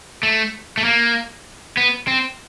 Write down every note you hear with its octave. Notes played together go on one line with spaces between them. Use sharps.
A3
A3
A#3
B3
C4